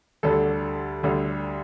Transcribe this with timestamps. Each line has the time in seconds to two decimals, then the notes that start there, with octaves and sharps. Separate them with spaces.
0.23 D2 D3 G3 A4
1.03 D2 D3 G3